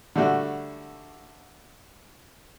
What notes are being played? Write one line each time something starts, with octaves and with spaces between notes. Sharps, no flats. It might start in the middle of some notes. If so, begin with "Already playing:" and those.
D3 G3 A3 F#4